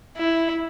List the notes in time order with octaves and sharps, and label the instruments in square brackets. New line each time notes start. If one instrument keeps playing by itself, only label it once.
[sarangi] E4